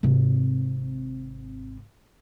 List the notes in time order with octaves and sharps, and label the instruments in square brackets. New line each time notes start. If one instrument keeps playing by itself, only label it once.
[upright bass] G#1 C3